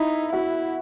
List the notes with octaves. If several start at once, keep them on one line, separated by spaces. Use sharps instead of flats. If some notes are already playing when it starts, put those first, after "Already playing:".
Already playing: D#4 E4 E5
E4 F#4 F#5